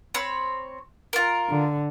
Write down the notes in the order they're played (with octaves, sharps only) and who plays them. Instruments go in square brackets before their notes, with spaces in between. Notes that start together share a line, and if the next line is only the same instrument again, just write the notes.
[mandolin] C4 C#5 B5
F4 A#4
[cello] D3